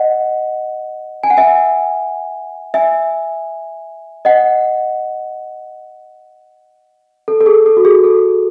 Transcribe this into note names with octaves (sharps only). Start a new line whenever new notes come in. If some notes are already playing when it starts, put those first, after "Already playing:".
Already playing: D#5 F#5
G#5
F#5
E5 G#5
E5 G#5
D#5 F#5
A4
A4
G#4
A4
F#4
G#4
A4